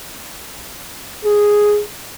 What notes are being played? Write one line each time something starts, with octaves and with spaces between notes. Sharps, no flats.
G#4